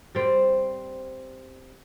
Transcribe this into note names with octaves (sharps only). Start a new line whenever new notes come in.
G3 C4